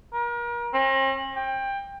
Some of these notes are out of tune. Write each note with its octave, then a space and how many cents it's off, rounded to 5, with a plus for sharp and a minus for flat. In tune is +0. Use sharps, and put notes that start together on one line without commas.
A#4 +35
C4 +45
G5 +20